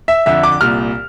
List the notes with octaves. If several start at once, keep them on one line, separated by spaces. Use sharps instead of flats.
E5
F2 D3 E5
D6
C2 A#2 F6